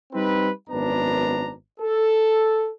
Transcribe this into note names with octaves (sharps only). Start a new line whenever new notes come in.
G3 C4 D#4 B4
G#1 F#2 B3 D4 A#5
A4